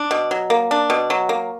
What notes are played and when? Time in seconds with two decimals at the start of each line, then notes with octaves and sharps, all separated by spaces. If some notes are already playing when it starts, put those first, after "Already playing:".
Already playing: D4
0.11 B2
0.31 F#3
0.50 A#3
0.71 D4
0.90 B2
1.10 F#3
1.29 A#3